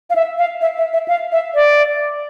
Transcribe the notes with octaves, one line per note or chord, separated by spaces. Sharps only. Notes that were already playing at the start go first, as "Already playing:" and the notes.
F5
E5
F5
E5
E5
E5
F5
E5
D5